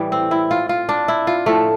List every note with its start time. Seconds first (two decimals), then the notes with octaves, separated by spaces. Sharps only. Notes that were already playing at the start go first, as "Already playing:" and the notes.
Already playing: A2 E3 G3
0.12 C4
0.31 E4
0.51 F4
0.69 F4
0.89 D4
1.08 E4
1.27 F4
1.46 A2 F3 A3